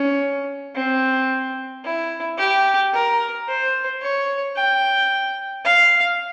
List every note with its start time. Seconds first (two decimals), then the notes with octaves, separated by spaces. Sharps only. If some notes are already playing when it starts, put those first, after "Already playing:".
Already playing: C#4
0.75 C4
1.85 E4
2.38 G4
2.93 A#4
3.48 C5
4.01 C#5
4.56 G5
5.65 F5